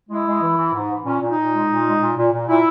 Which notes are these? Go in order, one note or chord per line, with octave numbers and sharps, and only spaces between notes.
G#3 E4
G#3
E3
E3
G#2
E3
A#2 C#4
A#2
D#4
A#2
G#3
A#2
G#3
A#2
A#2
A#2
A#2 E4